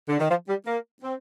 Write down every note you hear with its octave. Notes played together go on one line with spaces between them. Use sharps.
D3
D#3
F3
G3
A#3
C4